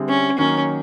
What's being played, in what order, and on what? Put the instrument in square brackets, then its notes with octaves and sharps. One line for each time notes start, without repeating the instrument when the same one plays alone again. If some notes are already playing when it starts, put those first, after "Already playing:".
Already playing: [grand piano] D3 G3 C4 E4 G#4
[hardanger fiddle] C#4
[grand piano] D#3 F#3 A#3 [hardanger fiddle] C#4